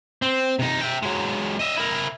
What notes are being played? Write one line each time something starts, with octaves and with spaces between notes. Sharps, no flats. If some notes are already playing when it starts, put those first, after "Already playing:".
C4
C3 D#4
E5 G5
F#3 G#3
D#5 E5
E4 A#4